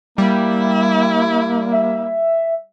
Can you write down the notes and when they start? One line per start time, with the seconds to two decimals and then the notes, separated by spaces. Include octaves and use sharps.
0.18 G3 A#3 E4
1.72 E5